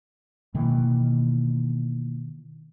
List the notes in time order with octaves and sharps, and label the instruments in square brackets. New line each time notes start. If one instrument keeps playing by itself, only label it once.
[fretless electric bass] B2 D#3 E3 A#3